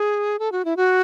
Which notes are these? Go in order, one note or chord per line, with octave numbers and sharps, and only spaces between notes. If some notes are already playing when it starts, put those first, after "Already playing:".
Already playing: G#4
A4
F#4
E4
F#4